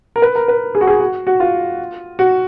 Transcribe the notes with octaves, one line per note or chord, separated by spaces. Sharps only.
A#4
B4
A#4
B4
G#4
F#4
G#4
F#4
F#4
F4
F#4